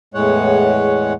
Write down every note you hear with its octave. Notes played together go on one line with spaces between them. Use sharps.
E2 A2 G#3 C#5 F#5